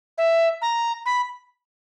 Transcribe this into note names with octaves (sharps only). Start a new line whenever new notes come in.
E5
A#5
B5